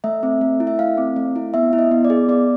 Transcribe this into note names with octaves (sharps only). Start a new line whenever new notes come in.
A3 E5
C4
A3
E4
E5
A3 F5
C4
A3
E4
B3 E5
E4
D#5
B3
D5
G#4
B3 D5